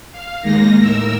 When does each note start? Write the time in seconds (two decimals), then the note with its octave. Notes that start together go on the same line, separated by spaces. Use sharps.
0.12 F5
0.42 D#2 G#3 A#3 D#4 A#6
0.78 A2 A#4 E6